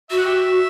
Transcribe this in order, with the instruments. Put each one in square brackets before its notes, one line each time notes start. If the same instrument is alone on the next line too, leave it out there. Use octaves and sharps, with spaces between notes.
[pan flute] F#4 [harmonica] E5
[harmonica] F#5
G4 E5